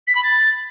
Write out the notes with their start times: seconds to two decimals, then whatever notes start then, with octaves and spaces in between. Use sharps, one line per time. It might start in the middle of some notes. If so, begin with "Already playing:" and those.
0.07 B6
0.15 B5
0.23 A6